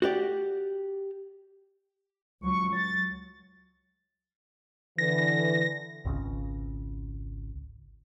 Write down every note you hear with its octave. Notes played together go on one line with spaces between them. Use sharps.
F#4 G4 D5
C#2 F#3 C#6
F#3 A6
D3 E3 A#6
G#1 C#2 C#3